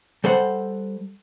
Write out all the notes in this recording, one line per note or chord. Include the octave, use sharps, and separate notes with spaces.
G3 A4 C5 F#5